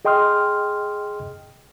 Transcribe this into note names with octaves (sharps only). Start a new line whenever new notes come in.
G#4 D#5 G5 C6 D#6 F6